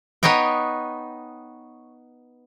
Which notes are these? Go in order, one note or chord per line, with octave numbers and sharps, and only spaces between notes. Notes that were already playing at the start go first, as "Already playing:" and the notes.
B3 D#4 C#5 D#5 G5